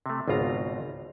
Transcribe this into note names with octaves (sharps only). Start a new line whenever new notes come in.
C3 A3
G#1 C#2 B2 F4 A#5